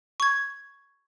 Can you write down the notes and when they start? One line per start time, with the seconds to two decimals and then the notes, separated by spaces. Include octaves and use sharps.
0.20 C#6 G#6